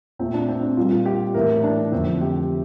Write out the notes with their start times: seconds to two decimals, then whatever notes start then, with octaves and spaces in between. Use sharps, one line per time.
0.19 A#2 A3 C4
0.34 D4
0.49 C4
0.63 D4
0.77 A#2 G3 A#3 F4
1.06 G4
1.34 A2 E3 A3 A#4
1.63 D4
1.92 F2 D3 A3 C4
2.21 G4